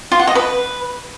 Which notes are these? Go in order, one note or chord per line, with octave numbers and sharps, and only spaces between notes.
F4
F#5
D#5
B4